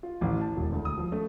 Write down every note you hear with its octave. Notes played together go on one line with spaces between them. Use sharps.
F4
A1
A5
E1
D2
D#6
F3
A3